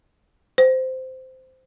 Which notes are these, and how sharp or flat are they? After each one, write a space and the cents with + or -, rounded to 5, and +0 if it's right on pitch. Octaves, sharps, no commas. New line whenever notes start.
C5 -10